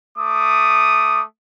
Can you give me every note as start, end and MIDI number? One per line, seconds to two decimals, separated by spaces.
0.19 1.23 57
0.19 1.23 86
0.19 1.23 87